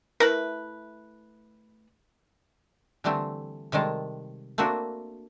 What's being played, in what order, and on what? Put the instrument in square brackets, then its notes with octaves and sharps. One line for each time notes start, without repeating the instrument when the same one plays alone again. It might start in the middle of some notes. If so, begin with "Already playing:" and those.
[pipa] A3 E4 B4 [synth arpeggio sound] A#4
[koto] D3 E3 G3 A3 C4
C3 D#3 G3 G#3 A4
A3 A#3 C4 D4 F#4